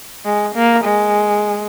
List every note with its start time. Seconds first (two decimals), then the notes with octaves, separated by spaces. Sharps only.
0.25 G#3
0.55 A#3
0.84 G#3